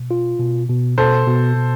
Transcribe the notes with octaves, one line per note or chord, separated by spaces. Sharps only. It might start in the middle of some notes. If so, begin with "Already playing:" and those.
Already playing: B2
F4
B2
B2
B2 A4 C5
B2
B2